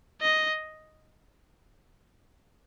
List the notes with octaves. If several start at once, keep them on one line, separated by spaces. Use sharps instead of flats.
D#5